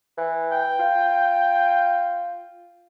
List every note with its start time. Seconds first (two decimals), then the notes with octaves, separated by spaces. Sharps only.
0.18 E3
0.51 G5
0.80 F4